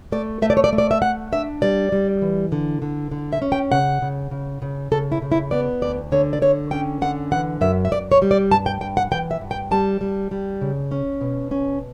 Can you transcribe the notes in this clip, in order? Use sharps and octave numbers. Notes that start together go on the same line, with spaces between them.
A3 D5
A3 E5
D5
C#5
D5
A3
D5
E5
A3 F#5
D4 E5
G3 D5
G3
E3
D3
D3
D3
E5
C#4
G5
C#3 F#5
C#3
C#3
C#3
C#3 A4
E4
C#3
E4
B3 D5
D2 D5
D3 C#5
D5
D3 C#5
C#4 G5
D3 F#5
E3 F#5
F#2 E5
E5
F#2 D5
C#5
G3
D5
G2 A5
G5
G2 G5
F#5
E3 G5
E5
G2
G5
G3 A5
G3
G3
C#3
C#4
B2
C#4